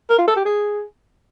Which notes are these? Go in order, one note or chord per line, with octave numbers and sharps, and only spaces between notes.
A#4
F4
A4
G4
G#4